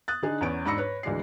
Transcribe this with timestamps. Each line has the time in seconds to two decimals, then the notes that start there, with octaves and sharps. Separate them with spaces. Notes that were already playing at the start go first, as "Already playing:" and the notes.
0.08 D#6 F#6 A6
0.22 D3 D#4 G#4
0.41 E2 B3 C#4 D7
0.66 G#2 D4 B5 E6 A#6 C#7
0.78 B4 C#5
1.03 D2 E3 G#3 D5 C7